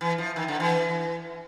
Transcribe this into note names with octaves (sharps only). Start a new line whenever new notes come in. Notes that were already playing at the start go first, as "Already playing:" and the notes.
E3
F3
D#3
D3
E3